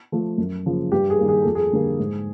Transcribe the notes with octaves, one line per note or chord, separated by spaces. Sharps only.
F3 A3
F#2
C#3 F3 A#3
G2 G4
G#4
D#3 G3 A#3
G#4
F2 A4
G#4
D3 G3 A#3
G#2